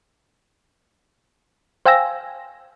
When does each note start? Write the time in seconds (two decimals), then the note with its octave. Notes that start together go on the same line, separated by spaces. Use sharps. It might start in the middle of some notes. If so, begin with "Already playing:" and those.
1.86 C5 F5 G5 G#5 E6 A#6